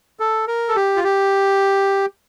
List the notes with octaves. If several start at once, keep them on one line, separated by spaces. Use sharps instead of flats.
A4
A#4
A4
G4
F4
G4